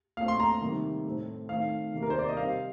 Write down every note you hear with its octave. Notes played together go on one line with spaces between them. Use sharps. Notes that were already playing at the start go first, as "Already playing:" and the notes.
A#2 A3 C4 F5
C6
A#5
C3 D#3 G3 A#3
A2 A3 C4
D#3 A3 C4 F5
C3 D#3 A#3
A#4
C5
D5
D#5
C3 G3 C4 F5